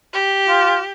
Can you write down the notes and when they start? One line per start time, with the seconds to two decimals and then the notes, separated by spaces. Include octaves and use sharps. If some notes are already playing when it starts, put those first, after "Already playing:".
0.13 G4
0.49 F4